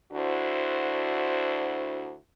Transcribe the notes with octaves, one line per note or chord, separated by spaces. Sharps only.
D2 D4 E4 F#4 C5